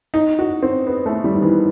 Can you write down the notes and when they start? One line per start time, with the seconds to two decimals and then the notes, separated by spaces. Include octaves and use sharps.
0.14 D#4
0.39 F#4
0.63 C4
0.87 B3
1.06 A3
1.24 G3
1.36 D#3
1.42 E3